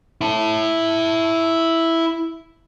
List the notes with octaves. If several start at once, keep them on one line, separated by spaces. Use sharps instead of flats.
E4 A5